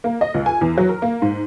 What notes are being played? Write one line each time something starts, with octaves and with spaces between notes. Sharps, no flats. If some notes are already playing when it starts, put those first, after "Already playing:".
A#3
D#5
C#2
G#5
E2
F#3
A#4
A#3
G#2